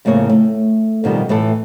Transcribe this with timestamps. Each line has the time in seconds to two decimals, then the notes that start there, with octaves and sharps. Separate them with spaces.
0.05 F2 A2 C#3 A#3 C#5
0.29 A3
1.04 F2 B2 D#3 G3
1.29 A2 E3 A3 A4